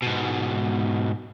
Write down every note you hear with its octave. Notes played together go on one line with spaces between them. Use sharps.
G#2 B2